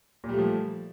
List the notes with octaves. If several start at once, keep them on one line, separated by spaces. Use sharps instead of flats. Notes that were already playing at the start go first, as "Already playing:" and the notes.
A#2 F3 G3 A3